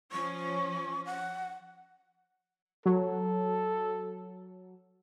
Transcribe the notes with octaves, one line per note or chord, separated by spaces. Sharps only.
F3 C#4 C#6
F#5
F#3 A4